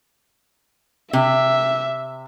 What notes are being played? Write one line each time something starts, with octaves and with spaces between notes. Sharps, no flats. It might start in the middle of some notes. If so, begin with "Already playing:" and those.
C3 E5